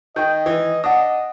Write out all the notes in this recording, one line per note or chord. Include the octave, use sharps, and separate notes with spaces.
D#3 D#5 G5 G6
E3
D4 D#5 F#5 D#6